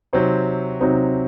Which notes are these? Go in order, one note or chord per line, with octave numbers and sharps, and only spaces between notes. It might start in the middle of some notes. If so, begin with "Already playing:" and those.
C3 F#3 C4 D#4
C3 F#3 C4 D#4